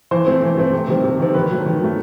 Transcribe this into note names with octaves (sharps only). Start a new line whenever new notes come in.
E3 C5
A3 C4
E3
A3 C4
C3
D#3 G3 C4
C3
D#3 G3 C4
D#3 B4
F#3 A3
D#3
F#3 A3